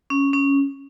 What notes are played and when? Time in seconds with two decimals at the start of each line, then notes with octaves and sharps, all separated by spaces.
0.10 C#4
0.33 C#4